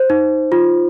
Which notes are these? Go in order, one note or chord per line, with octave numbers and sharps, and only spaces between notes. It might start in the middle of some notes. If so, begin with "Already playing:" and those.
Already playing: C5
D#4
F4